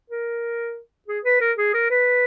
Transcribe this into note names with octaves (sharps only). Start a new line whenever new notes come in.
A#4
G#4
B4
A#4
G#4
A#4
B4